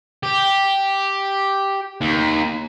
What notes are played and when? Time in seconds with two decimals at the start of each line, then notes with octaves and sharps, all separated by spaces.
0.23 G4
2.01 D#2